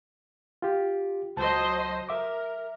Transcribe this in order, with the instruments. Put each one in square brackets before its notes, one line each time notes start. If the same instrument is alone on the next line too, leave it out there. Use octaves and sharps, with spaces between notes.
[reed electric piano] F4 G4
[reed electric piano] C#2 A5 [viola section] F#3 C5 D#5
[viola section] A#4 [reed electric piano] E5 D6